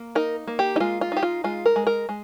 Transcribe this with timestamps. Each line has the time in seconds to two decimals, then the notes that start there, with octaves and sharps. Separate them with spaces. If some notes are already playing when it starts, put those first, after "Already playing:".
Already playing: A#3
0.15 D#4 A#4
0.47 A#3
0.59 G4
0.76 D#4
0.80 G#3 F4
1.01 F4
1.12 D#4 G4
1.23 F4
1.44 G#3 F4
1.66 A#4
1.76 G#3
1.87 A#4
2.09 G#3